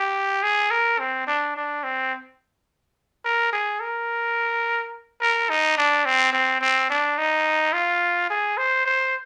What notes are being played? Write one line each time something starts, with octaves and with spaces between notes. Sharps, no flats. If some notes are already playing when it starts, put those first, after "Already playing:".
Already playing: G4
G#4
A#4
C4
D4
D4
C4
A#4
G#4
A#4
A#4
D#4
D4
C4
C4
C4
D4
D#4
F4
G#4
C5
C5